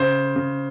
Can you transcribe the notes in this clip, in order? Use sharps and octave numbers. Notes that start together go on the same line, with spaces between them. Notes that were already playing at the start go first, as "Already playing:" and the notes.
Already playing: C#3 C5
C#3